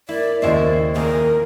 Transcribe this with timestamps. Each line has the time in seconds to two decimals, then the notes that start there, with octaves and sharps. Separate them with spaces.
0.09 A#3 E4 D5
0.42 D#2 G#2 C#3 A#3 E4 C5 D5 D#5
0.95 F2 A#2 D#3 A#3 G#4 A#4